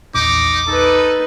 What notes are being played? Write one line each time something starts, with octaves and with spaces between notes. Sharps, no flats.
A#1 E2 D#4 D6
D#4 A4 B4